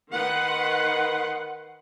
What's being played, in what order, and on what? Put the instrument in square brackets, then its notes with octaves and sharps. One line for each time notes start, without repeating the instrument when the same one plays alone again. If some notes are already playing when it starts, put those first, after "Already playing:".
[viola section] D#3 B4 F#5 C6